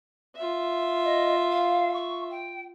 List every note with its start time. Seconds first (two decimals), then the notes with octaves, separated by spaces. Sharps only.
0.36 F4 E5
1.04 D#5
1.51 F5
1.93 C#6
2.30 G5